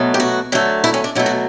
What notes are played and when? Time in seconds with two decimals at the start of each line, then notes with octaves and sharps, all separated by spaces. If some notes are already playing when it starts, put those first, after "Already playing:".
Already playing: B2 F#3 A3
0.14 G4
0.20 F#4
0.52 D3 F#3 A3
0.84 E4
0.94 C#4
1.04 D4
1.15 B2 F#3 A3 E4
1.26 F#4